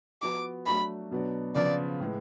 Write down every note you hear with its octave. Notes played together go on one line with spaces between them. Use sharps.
F3 B3 F#4 D6
F#3 A3 D4 F#4 B5
B2 F#3 B3 D4
C#3 F3 B3 F4 D5
A2 G#3 B3